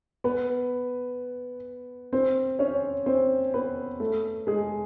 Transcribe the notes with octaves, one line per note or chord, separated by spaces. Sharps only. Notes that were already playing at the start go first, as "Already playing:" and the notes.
B3 B4
C4 C5
C#4 C#5
C4 C5
B3 B4
A3 A4
G#3 G#4